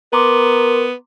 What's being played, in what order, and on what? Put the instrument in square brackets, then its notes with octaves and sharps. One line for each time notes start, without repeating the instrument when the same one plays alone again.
[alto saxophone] B3 [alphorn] A#4 [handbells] A#5 C6 D6